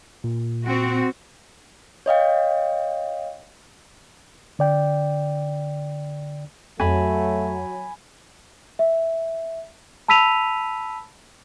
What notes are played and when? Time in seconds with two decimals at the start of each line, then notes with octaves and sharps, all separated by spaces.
0.24 A#2
0.65 C4 F#4
2.06 C#5 D#5 F5 G5
4.59 D3 D5 G5
6.80 F2 F#3 A3 G#5 B5
8.79 E5
10.08 A5 B5 E6 B6 D#7 F7